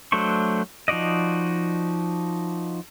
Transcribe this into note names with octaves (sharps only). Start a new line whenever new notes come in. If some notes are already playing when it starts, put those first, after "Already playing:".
F#3 A3 D4 C5 C#6
F3 D#4 F#4 D5 D#5